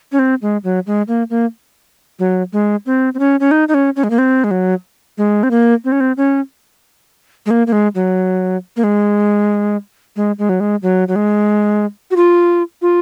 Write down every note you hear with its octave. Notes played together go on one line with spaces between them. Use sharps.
C#4
C4
G#3
F#3
G#3
A#3
A#3
F#3
G#3
C4
C4
C#4
C#4
D#4
D#4
C#4
C#4
G#3
A#3
C4
G#3
F#3
G#3
C4
A#3
C4
C#4
C4
C#4
G#3
A#3
A#3
G#3
F#3
A#3
G#3
G#3
G#3
F#3
G#3
F#3
F#3
G#3
F#4
F4
F4